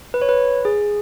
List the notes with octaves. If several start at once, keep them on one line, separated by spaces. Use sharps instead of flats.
B4
C#5
B4
G#4